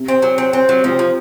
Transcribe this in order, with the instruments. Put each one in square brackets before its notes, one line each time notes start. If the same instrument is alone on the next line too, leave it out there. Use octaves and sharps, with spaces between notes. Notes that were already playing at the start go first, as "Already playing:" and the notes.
Already playing: [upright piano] C3
[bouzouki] C4
F#3
C4
C4
F#3
[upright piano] C3 [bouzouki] F3
[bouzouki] F3